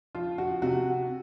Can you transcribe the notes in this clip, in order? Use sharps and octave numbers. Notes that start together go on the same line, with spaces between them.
F3 F4
F#4
C3 F#4